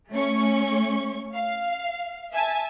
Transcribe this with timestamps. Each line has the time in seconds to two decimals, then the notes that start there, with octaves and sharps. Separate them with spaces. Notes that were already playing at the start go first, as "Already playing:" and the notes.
0.12 A3 C#4 C#6
1.34 F5
2.33 E5 G#5 A5